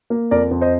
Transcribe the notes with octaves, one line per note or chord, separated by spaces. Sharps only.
A#3
F2 A#4 D5
F2
C5 D#5